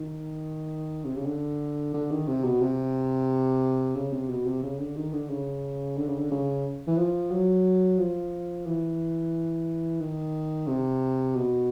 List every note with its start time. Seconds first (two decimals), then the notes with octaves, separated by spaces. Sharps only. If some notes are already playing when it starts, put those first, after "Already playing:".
Already playing: D#3
1.05 C3
1.16 C#3
1.26 D3
1.93 D3
2.11 D#3
2.27 C3
2.44 B2
2.61 C3
3.96 C#3
4.12 C3
4.29 B2
4.46 C3
4.63 C#3
4.79 D3
4.96 D#3
5.13 D3
5.30 C#3
5.97 D3
6.08 C#3
6.18 D3
6.31 C#3
6.87 E3
6.98 F3
7.31 F#3
7.99 F3
8.66 E3
10.01 D#3
10.68 C3
11.36 B2